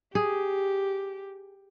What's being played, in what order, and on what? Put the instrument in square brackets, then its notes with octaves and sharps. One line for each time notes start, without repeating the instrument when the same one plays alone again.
[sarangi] G4 [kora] G#4